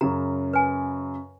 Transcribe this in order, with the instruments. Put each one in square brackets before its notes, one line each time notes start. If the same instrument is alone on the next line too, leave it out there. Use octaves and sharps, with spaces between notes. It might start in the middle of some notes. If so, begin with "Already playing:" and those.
[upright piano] F#2 C#3 [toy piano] A#5
[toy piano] B4 G#5